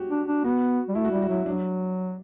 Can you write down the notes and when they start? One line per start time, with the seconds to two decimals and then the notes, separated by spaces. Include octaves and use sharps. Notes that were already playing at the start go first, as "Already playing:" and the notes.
Already playing: F#4 G4
0.11 D4
0.27 D4
0.44 B3 F#4
0.88 G3
0.95 A3 E4
1.05 F#4
1.12 G3 E4
1.22 F#4
1.29 F#3 E4
1.46 F#3 D4